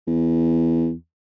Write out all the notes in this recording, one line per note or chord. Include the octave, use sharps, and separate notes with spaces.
E2